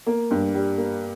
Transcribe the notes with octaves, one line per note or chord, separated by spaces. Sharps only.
A#3
G2
G3
A#3